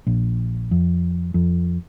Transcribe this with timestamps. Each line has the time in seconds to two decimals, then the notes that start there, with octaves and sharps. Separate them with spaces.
0.07 A#1
0.71 F2
1.34 F2